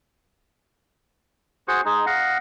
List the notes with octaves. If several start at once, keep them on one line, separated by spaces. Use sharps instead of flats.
F#4 G#4 C5 C#6
G#3 D#4 G#4
D#5 F5 F#5